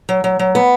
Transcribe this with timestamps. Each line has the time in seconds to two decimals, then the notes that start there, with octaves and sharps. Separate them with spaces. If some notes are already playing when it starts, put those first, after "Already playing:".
0.09 F#3
0.24 F#3
0.39 F#3
0.55 B3